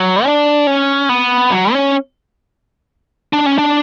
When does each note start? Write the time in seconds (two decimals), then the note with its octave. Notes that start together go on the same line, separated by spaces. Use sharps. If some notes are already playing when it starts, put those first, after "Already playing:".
Already playing: F#3
0.25 D4
0.67 C#4
1.09 B3
1.52 F#3
1.73 C#4
3.33 D4
3.46 C#4
3.58 D4